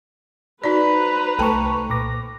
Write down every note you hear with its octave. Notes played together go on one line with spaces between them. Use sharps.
D#4 F#4 B4 C5 D5 A#5
C2 A3 A4 G5 A5 C#6
A#2 D6 A#6